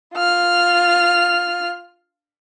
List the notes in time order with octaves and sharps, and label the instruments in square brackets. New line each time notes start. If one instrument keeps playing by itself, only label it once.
[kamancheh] F4 F6